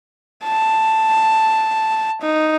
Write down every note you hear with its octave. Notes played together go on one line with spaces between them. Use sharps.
A5
D#4